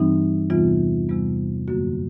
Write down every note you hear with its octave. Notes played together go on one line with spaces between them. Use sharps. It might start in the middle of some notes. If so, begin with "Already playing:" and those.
Already playing: G2 E3 G3 C4 D#4
E2 C3 E3 G3 B3 F4
E2 C3 E3 G3 B3
F#2 D3 F#3 A#3 F#4